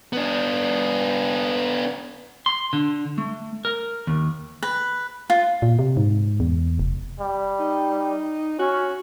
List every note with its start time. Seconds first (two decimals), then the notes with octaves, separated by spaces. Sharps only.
0.13 B3 D4
2.46 C6
2.73 D3
3.18 A3
3.65 A#4
4.07 D#2
4.63 B4
5.30 F4
5.62 A#2
5.79 C3
5.97 G#2
6.40 E2
6.79 F1
7.20 G3
7.59 D#4
8.59 C#4 F#4